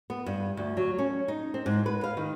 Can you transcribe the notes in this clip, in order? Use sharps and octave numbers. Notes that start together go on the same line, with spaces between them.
B3
G2
D2
F#3
C#4
D#4
C4
G#2
B4
F5
D#3